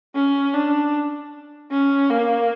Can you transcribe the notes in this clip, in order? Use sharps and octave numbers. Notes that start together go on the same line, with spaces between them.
C#4
D4
C#4
A#3